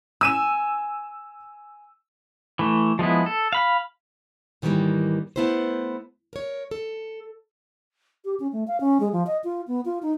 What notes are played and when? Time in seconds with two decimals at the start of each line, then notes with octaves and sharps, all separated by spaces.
0.21 G#5 E6 D#7 E7
2.59 E3 A3
2.99 F3 G#3 B3 E4
3.26 A4
3.53 F5 B5
4.62 G#2 D#3 E3 F#3 G3 A#3
5.36 A3 B3 E4 G4 C5
6.33 A#4 C#5
6.71 A4
8.25 G4
8.40 C#4
8.53 A3
8.68 F5
8.80 C#4
9.00 G#3
9.12 F3
9.27 D#5
9.44 F4
9.68 B3
9.85 F4
10.03 D#4